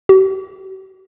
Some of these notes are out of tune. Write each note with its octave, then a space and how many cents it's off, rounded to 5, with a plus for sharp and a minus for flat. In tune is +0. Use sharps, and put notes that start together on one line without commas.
G4 -45